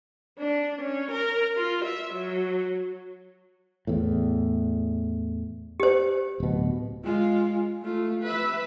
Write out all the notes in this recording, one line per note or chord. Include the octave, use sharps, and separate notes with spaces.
D4
C#4
A#4
F4
E5
F#3
E2 A2
G4 C5
D1 B2
G#3 F4
A3 F4
B4 E5